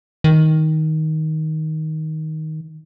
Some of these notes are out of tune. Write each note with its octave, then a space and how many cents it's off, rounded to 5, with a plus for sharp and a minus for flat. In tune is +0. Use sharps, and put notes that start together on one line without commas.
D#3 +10